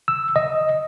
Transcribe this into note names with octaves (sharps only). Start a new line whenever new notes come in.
E6
D#5